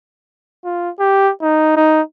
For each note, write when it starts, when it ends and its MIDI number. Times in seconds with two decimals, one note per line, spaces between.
0.64 0.89 65
0.99 1.30 67
1.42 1.76 63
1.76 2.01 63